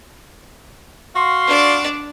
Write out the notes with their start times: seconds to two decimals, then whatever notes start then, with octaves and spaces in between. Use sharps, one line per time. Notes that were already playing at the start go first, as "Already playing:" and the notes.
1.16 F#4 F5 C6
1.47 D4 D5